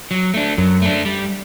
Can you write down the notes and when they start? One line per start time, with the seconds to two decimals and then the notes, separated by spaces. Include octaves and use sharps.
0.11 F#3
0.34 A3 D4
0.58 F#2 F#3
0.82 A3 D4
1.05 G3